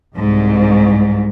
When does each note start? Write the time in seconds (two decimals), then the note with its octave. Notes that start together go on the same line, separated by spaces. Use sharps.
0.17 C2 G#2